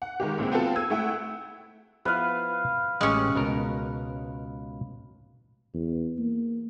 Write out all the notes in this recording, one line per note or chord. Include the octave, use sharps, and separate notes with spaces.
F#5
D#3 G#3 G4
C#2 A#2 G#3 C4
B3 C4 F4 F#4 A4
E6 G#6 D#7
A3 E4 F#5 G5
F3 B3 E4 B4 F5
A1 G#3 C#4 G4 G5
C#2 B2 A#4
E2
A#3